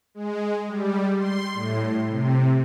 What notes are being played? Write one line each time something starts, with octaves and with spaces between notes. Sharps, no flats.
G#3
G3
C6
A2
C3